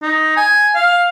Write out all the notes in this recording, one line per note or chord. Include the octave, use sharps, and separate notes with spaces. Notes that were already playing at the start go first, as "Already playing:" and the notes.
D#4
G#5
F5